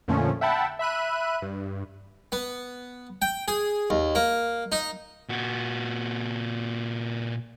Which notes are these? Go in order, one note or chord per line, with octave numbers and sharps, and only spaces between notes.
F2 A#2 D3 F3 A3 C#4
E5 F#5 G5 A5 B5
E5 B5 F#6 D#7
G2
B3
G5
G#4
D#2
A#3
D#4
A#2 F#4